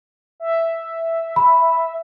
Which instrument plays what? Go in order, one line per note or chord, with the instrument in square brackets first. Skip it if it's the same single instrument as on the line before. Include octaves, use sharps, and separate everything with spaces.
[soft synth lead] E5
[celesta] B5